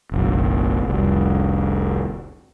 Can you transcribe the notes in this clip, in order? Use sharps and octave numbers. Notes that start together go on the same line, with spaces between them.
F#1 B1
F1 C2